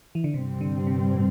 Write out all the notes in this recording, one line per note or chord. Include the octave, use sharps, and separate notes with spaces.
E3
D3
G2 C3 G3 C4
D3
C3
A2